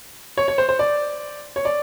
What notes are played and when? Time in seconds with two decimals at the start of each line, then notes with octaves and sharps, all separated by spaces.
0.37 C#5
0.48 C#5
0.58 C5
0.69 C5
0.79 D5
1.56 C#5
1.65 D5